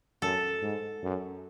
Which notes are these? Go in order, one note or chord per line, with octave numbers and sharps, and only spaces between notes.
F#2 A4
G#2
F#2